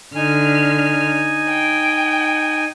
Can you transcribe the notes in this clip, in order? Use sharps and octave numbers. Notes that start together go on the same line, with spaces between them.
D3 D#4 G#5 F6
G5